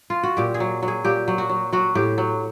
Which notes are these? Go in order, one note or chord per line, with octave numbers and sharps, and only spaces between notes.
F4
F#4
A#2 G4
G#4
F#3
F#3
G#4
A#2 G4
F#3
F#4
F#3
F#3 F#4
A2 G4
F#3